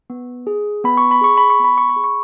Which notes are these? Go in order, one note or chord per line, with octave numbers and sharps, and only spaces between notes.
B3
G#4
B3 B5
C#6
B5
G#4 C#6
B5
C#6
B3 B5
C#6
B5
G#4
C#6